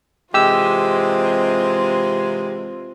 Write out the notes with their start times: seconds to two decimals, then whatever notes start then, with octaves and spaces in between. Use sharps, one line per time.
0.34 C3 E3 G#3 C4 F4 G4 E6